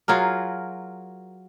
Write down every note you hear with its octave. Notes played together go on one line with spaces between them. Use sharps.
F#3 F4 G#4 A#4